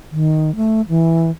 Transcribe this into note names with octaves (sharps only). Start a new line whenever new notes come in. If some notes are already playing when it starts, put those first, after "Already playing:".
D#3
A3
E3